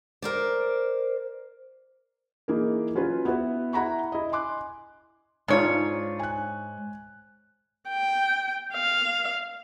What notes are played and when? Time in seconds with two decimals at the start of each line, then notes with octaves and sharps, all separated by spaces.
0.22 A#4 C5 D5
2.48 E3 A#3 D#4 G#4 A#4
2.95 F#3 C#4 F4 F#4 B4
3.25 B3 E4 F#4 B4
3.73 E4 F#5 A#5 B5 C#6
4.12 E4 D#5
4.32 G#5 C6 D6 F#6
5.48 G#2 D4 D#4 F4 C#5
6.20 G#5 F#6
7.89 G5
8.73 F5